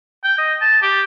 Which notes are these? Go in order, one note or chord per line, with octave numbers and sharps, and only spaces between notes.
G5
D#5
A5
G4